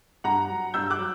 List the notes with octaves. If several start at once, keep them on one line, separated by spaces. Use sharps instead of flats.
G2 F#5 A#5
F#3
G2 E6 G6
D6 F#6
F#3